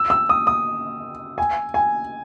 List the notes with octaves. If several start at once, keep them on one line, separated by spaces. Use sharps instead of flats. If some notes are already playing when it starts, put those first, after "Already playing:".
Already playing: E6
E6
D#6
D#6
G#5
G#5